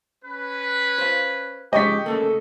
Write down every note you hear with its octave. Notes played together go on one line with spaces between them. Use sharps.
C#4 B4
C5 F5
G#2 C#3 G#3 G4 D#5 C#6 B6
C#3 A3 A#3 A4